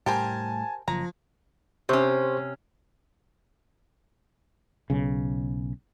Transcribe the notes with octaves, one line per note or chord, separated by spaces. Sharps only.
A2 G3 G4 A#4 C5 G#5 A5
F#1 F3 A#5
C3 C#4 G4 C5 C#6
B1 C#3